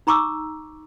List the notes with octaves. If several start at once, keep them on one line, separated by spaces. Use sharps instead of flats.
D#4 A#5 C#6 D6 E6